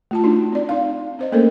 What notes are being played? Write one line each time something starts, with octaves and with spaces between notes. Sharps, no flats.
A3 F4 A5
D4 D#4 F#4
C4 D5
D#4 F5
C4 C5 D#5
A3 A#3 C#4 A4 A#4 C5